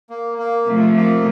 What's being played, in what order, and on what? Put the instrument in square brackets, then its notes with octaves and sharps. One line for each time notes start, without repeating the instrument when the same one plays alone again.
[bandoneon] A#3
A#3
[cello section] C3 F3 A3
[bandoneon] A#3